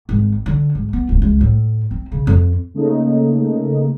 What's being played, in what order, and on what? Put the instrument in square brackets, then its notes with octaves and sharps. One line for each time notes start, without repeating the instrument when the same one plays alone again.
[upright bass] G#1
D3
G#1
B3
D1
C#2
A2
C4
C#3
F2
[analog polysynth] C#3 A3 A#3 D#4